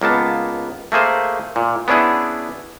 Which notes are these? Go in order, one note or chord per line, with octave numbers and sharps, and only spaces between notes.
C#2 A#3 B3 A5
A3 A#3 G#4 C5
A#2
B3 C#4 D4 E4 G#4